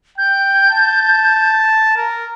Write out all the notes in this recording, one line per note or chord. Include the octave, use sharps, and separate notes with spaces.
G5 G6
A5
A#4